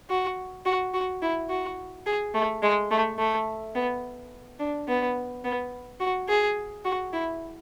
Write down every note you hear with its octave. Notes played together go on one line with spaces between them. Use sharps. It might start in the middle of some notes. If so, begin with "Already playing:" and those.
F#4
F#4
F#4
E4
F#4
G#4
A3
G#3
A3
A3
B3
D4
B3
B3
F#4
G#4
F#4
E4